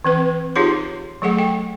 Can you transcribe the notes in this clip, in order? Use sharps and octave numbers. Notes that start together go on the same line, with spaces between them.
E3 C4 B4
D#4 F4 G4 G#4 C#5 C6
F#3 A3 G#4 A4 F#5
G5